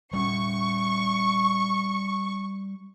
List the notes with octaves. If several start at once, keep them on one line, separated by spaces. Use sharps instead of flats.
G3 C#4 C#6